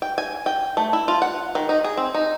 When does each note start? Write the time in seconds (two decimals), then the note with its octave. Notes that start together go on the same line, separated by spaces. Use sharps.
0.02 G5
0.18 G#5
0.46 G5
0.77 A3
0.93 E4
1.08 F4
1.22 F#5
1.55 D#3
1.69 D#4
1.84 G#4
1.97 C4
2.14 D#4